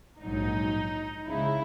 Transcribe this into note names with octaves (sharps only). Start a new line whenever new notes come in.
A#1 G#2 F#3 D#4
C#2 C#3 G#3 E4